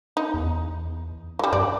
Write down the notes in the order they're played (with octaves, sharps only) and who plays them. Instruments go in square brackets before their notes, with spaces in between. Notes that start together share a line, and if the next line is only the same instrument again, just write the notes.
[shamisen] D#4
[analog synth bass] E2
[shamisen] F#3 G3
[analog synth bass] G2 [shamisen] D5